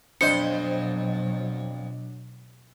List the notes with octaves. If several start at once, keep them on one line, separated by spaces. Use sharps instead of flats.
F2 B2 F#3 D4 C5 D#5 C#7